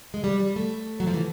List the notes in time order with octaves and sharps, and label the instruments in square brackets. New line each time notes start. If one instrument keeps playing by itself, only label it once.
[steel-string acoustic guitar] G#3
G3
G3
A3
F#3
F3
E3